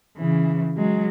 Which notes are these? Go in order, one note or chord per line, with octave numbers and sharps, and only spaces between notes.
C#3 E3
F#3 G#3